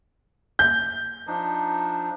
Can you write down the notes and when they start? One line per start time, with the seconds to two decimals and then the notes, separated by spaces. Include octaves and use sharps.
0.59 G6
1.27 F3 D4 D#4